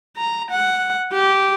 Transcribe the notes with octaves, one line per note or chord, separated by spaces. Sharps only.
A#5
F#5
G4